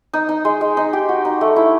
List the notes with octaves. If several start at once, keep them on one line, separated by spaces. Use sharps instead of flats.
D#4
D#4
G#3
G#3
D#4
G4
F#4
D#4
A3
E4